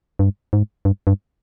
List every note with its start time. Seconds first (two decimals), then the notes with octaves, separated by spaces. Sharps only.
0.19 G2
0.53 G#2
0.85 G2
1.07 G2